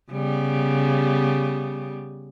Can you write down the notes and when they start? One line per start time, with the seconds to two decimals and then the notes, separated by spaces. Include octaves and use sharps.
0.12 C#3 G3 B3